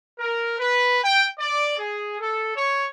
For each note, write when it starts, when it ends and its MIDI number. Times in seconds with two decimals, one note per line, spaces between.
0.18 0.55 70
0.58 0.98 71
1.02 1.24 79
1.38 1.76 74
1.77 2.18 68
2.20 2.53 69
2.55 2.86 73